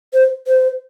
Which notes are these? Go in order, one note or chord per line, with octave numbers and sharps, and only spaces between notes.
C5
C5